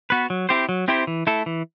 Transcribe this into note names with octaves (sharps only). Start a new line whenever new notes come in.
B3 F#4 B4
F#3
C4 E4 G4 C5
F#3
C4 E4 G4 C5
E3
A3 E4 A4
E3